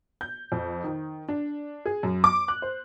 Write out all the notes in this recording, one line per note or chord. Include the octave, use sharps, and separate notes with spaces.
G6
F2
D#3
D4
G#4
F#2
D6
F#6
C5